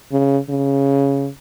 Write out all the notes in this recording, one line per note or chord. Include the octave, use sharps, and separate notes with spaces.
C#3
C#3